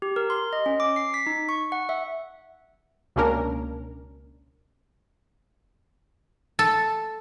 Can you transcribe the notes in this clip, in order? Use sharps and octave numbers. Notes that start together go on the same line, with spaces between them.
G4
A#4
C6
D#5
C#4
D6
C7
B6
D#4
C#6
F#5
E5
C#2 B2 A#3 C#4 D4 A#4
A4